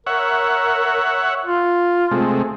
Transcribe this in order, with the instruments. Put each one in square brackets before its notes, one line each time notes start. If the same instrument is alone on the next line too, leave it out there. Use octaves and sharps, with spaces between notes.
[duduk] A#4 [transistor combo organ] C#5 E5 F#5
[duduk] F4
[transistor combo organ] C3 G#3 A3